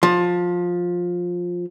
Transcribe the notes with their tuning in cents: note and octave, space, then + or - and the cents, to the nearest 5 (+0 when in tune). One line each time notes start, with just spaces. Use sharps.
F3 +15